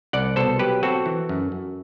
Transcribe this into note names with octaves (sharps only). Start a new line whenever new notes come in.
C2 D5 F#5
B2 A4 C5
F#3 G4 B4
C4 F#4 A4
E3
F#2
F#2